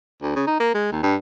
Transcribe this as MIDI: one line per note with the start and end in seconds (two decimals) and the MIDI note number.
0.22 0.34 38
0.36 0.45 49
0.47 0.55 63
0.60 0.74 58
0.74 0.91 56
0.92 1.03 39
1.03 1.15 43